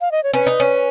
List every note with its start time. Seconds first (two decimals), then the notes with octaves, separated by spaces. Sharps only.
0.01 F5
0.12 D#5
0.23 C#5
0.33 C#4 B4
0.47 D#4
0.60 C#4